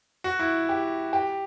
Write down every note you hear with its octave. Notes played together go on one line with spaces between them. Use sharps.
F#4
E4
G4
G4